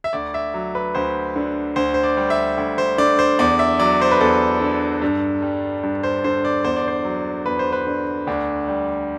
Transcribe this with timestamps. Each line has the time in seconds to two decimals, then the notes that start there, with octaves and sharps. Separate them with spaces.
0.04 E5
0.13 D2 D5
0.34 E5
0.54 F#3
0.75 B4
0.95 D2 C5
1.36 D3
1.76 D2 C5
1.94 C5
2.03 D5
2.17 G3
2.30 E5
2.58 D2
2.78 C5
2.98 D3 D5
3.19 C5
3.39 E2 D5
3.59 E5
3.80 F#3 D5
4.01 C5
4.11 B4
4.21 E2 A4
4.61 D3
5.02 G2
5.42 G3
5.83 G2
6.03 C5
6.24 D3 C5
6.45 D5
6.64 E2 C5
6.76 D5
6.88 C5
7.05 F#3
7.46 E2 B4
7.59 C5
7.73 B4
7.87 D3
8.27 D2 D4
8.68 G3